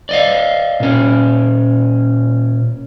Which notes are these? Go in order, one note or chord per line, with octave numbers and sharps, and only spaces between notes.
D5 D#5 F5
A#2 C#4